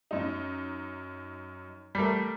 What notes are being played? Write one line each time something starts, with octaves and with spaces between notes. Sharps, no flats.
F#2 D#4
G3 A3 A#4 B6